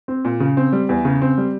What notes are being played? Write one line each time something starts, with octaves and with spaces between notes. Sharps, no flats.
C4
A#2
C#3
C4
G3
E2
C#3
C4
G3